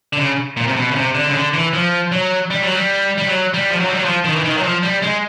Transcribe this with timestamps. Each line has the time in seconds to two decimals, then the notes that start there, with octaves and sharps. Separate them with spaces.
0.13 D3
0.18 C#3
0.57 A#2
0.67 C3
0.76 B2
0.91 C#3
0.96 C3
1.15 D3
1.26 C#3
1.34 D3
1.54 E3
1.73 F3
2.12 F#3
2.50 G3
2.62 F#3
2.74 G3
3.18 G3
3.27 F#3
3.54 G3
3.70 F3
3.80 F#3
3.89 G3
3.97 F#3
4.05 F3
4.24 D#3
4.36 E3
4.43 D#3
4.57 F#3
4.63 F3
4.83 G3
5.02 G#3